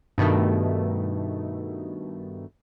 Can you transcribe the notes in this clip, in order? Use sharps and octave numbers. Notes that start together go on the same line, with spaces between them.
G2 B2 D#3 A3